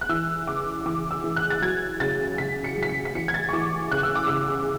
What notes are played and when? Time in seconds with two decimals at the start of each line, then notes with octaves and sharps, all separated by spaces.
0.01 F#6
0.09 E3 E6
0.47 C#3 D6
0.86 E3 D6
1.11 E6
1.24 E3
1.36 F#6
1.50 A6
1.62 F#3 G#6
2.00 C#3 A6
2.38 C#3 B6
2.64 C#7
2.77 F#3
2.83 B6
2.89 C#7
3.05 B6
3.15 E3 C#7
3.28 G#6
3.34 A6
3.49 C#6
3.53 E3 D6
3.91 C#3 F#6
4.03 E6
4.15 D6
4.27 C#3 E6